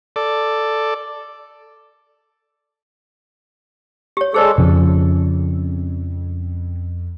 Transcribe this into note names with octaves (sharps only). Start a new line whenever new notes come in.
A4 D5
G4 C#5
G#3 G#4 A4 C5 D5
F2 C#3 F3